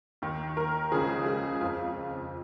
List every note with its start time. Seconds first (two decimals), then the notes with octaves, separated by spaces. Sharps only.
0.22 D#2 D#3
0.57 A#4
0.91 C#2 C#3 F3 G#4
1.26 G#4
1.61 F2 F3 F4